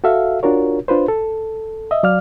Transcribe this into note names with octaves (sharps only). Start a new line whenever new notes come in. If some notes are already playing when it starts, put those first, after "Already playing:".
F#4 A4 E5 F5
D4 F4 F#4 A#4 C#5
D4 F4 B4 C5
A4
D#5 E5
F#3 D5 F5 F6